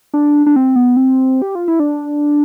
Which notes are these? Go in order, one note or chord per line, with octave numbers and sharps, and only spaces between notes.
D4
D4
C4
B3
C4
G4
F4
E4
D4